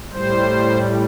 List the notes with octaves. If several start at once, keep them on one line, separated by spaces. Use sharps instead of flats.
A2 G3 C5